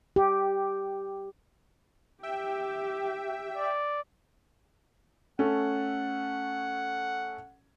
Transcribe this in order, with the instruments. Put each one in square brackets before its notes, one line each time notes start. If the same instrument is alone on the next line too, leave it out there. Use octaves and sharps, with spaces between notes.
[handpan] G4
[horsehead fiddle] G4 [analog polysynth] E5 G5
[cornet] D5
[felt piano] A3 C#4 A4 [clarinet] F#5